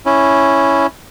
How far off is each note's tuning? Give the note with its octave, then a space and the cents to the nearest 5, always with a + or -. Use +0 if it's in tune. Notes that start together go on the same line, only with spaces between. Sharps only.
C#4 +0 E4 +0